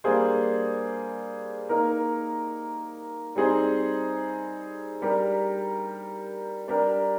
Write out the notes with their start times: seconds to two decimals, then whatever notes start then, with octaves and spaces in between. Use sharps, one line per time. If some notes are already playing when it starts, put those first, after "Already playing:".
0.04 G3 A#3 D4 G#4 C5
1.69 A#3 D#4 A#4
3.36 G3 C4 D#4 G#4 C5
5.02 G3 D4 G4 A#4
6.68 G3 D4 G4 A#4